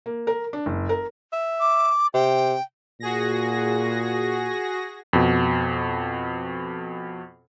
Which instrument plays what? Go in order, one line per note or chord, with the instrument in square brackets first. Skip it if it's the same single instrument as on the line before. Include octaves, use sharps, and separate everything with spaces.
[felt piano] A#3
A#4
D4
F#1
A#4
[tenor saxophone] E5
[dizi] D6
[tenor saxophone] C3 [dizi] G5
[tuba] A#2 [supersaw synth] F#4 G#4 A#6
[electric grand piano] F2 B2